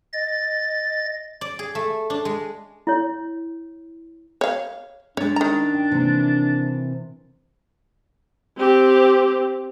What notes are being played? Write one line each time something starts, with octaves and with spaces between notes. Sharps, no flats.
D#5 A6
D5
G#4
A3
D4
G#3
E4 C#5
C#5 F5
G#3 C#4 D4 C#5
D#3 A#5
G5
C3 E3 A#3
C4 G4